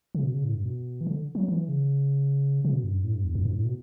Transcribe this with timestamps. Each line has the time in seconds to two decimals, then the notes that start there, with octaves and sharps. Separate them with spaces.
0.15 C#3
0.23 B2
0.34 C#3
0.44 A2
0.54 G2
0.65 B2
1.01 E3
1.07 D3
1.35 F#3
1.48 E3
1.69 C#3
2.65 C#3
2.73 B2
2.84 G2
2.94 F#2
3.04 A2
3.14 G2
3.24 E2
3.35 F#2
3.45 G2
3.56 A2
3.65 B2